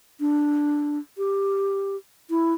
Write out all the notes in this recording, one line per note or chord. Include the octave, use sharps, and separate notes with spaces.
D4
G4
E4